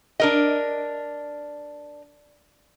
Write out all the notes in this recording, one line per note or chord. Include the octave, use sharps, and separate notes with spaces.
D4 A#4 D#5